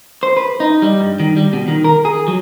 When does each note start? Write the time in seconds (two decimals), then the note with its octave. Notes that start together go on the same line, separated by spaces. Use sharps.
0.23 C5
0.37 B4
0.60 D#4
0.82 G3
1.00 G2
1.20 D#3
1.37 G3
1.53 B2
1.68 D#3
1.84 A#4
2.05 G#4
2.28 F#3